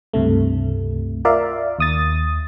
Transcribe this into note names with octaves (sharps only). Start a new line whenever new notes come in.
C#2 G2 C3 A3
F4 A#4 D5 E5 F5
D#2 D#6 A6